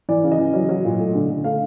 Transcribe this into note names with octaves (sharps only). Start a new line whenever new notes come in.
E3 D5
C#3
D#5
E3
F#3
F#3
A#2
A3
D3
D3
A3 F5